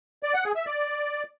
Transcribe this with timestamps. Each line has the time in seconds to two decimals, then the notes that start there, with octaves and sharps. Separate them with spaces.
0.23 D5
0.34 F#5
0.45 G#4
0.55 E5
0.66 D5